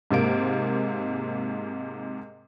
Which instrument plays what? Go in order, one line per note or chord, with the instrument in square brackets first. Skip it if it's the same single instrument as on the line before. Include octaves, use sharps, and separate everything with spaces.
[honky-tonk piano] G#2 C3 A#3 D7